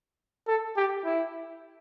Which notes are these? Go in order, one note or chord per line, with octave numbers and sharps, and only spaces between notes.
A4
G4
E4